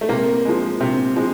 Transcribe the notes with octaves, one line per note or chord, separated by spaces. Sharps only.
A3
C3 A#3
F3 G#3
C3
F3 G#3